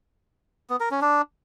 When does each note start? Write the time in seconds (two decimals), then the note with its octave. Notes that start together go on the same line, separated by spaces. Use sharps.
0.70 B3
0.80 A#4
0.91 C#4
1.01 D4